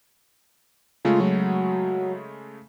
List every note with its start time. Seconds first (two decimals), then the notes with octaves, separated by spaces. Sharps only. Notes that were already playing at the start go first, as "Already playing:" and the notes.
1.05 C#3 G#3 A3 F4
1.20 F#3